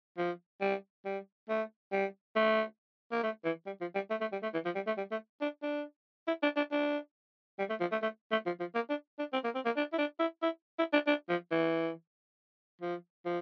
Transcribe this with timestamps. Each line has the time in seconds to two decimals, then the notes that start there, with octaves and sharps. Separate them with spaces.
0.18 F3
0.61 G3
1.05 G3
1.49 A3
1.92 G3
2.36 A3
3.12 A#3
3.23 A3
3.44 E3
3.66 G3
3.81 F3
3.95 G3
4.10 A3
4.21 A3
4.32 G3
4.43 A3
4.54 E3
4.65 F3
4.75 G3
4.87 A3
4.97 G3
5.11 A3
5.41 D4
5.63 D4
6.27 E4
6.43 D4
6.57 D4
6.72 D4
7.59 G3
7.70 A3
7.80 F3
7.92 A3
8.02 A3
8.32 A3
8.46 F3
8.60 F3
8.75 A#3
8.90 D4
9.19 D4
9.33 C4
9.44 A#3
9.55 C4
9.65 A#3
9.77 D4
9.93 E4
9.98 D4
10.20 E4
10.42 E4
10.79 E4
10.93 D4
11.07 D4
11.29 F3
11.51 E3
12.82 F3
13.25 F3